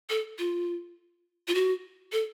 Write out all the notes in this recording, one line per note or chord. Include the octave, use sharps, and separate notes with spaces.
A4
F4
F4
F#4
A4